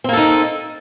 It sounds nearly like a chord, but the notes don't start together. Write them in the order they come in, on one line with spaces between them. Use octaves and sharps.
C4 A#3 A4 D#4